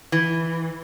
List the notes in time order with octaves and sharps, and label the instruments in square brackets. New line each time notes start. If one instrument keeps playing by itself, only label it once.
[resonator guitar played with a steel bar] E3